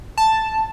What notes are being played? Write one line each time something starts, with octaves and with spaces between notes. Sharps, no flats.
A5